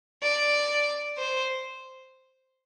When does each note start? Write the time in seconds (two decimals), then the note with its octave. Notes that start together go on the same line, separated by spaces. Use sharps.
0.23 D5
1.18 C5